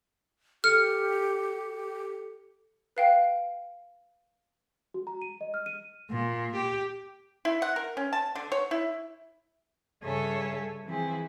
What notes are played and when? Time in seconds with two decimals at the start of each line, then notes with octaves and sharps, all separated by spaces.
0.64 G4 A4 F6 C#7
2.97 B4 F5 G5
4.94 F#4
5.07 A#5
5.22 D#7
5.41 D#5
5.54 F6
5.66 D#7
6.09 A#2
6.54 G4
7.45 E4
7.62 F#5
7.76 A#4
7.97 C#4
8.13 A5
8.35 D3
8.52 C#5
8.71 E4
10.03 G2 C#3 G#4 A4 C#5 E5
10.85 E3 F3 C4 E4 G#4